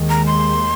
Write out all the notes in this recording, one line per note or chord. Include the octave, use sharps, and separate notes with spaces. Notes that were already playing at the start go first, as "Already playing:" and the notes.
Already playing: D#2 D#3 G#3
A#5
C6